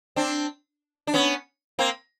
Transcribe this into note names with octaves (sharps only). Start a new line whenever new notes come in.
C4 D4
D4
B3 C#4
A#3 C4